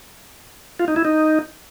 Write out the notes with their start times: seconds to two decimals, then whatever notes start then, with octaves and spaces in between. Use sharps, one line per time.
0.80 F4
0.88 D#4
0.96 E4
1.05 D#4